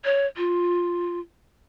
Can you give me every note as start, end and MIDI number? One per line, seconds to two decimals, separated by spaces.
0.05 0.26 73
0.37 1.20 65